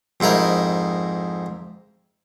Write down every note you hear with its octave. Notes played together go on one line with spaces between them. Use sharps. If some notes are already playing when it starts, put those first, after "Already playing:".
F2 G#2 E4 A#4 D#5